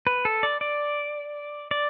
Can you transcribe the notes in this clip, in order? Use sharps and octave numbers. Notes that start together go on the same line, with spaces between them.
B4
A4
D5
D5
D5